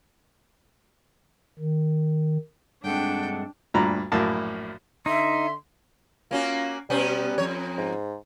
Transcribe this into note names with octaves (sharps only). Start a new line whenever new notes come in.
D#3
G2 G#3 C4 D4 A4 F#5 G5
D2 G2 A#2 A#5 B5
A#1 F#2 A2 A#3 A5
D3 D#4 E5 C6
A#3 C#4 F4 F#4
B2 G3 B3 C#4
F2 C#5
G#2